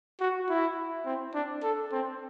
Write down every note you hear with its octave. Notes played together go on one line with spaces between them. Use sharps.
F#4
E4
C4
D4
A4
C4